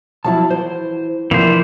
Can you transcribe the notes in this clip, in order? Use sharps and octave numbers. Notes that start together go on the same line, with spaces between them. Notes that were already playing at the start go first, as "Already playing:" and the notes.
F3 F#3 E4 A5
E3 C5
C3 E3 F3 A#3 D4 E4 C5